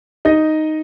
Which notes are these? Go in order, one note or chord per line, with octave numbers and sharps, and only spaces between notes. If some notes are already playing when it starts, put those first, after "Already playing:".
D#4 D#5